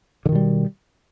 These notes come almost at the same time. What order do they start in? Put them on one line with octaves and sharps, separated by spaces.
D3 D#3 B2 G3